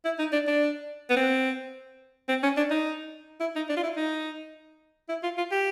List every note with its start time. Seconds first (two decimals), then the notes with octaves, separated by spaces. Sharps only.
0.05 E4
0.19 D#4
0.33 D4
0.47 D4
1.10 B3
1.16 C4
2.29 C4
2.43 C#4
2.57 D4
2.70 D#4
3.40 E4
3.56 D#4
3.69 D4
3.77 F4
3.83 E4
3.97 D#4
5.09 E4
5.23 F4
5.38 F4
5.52 G4